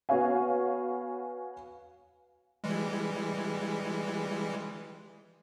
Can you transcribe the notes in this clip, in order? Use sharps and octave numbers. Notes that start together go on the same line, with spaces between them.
B3 F#4 C#5 F5 G#5
E3 G3 G#3